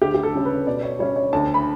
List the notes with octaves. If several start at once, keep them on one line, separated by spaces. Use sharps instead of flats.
D2 G4
G4
A4
C#3 G3 C#4
B4
B2 D5
C#5
G3 C#4 C#5
C#5
D2 A5
B5